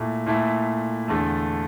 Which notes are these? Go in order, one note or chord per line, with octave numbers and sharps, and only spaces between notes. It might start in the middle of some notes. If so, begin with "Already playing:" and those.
Already playing: A#2 A3 E4
A#2 A3 E4
E2 D3 A3